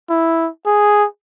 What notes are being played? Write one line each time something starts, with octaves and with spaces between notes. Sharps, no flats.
E4
G#4